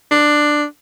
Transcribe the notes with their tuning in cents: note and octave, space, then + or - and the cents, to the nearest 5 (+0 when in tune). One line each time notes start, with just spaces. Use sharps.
D4 +10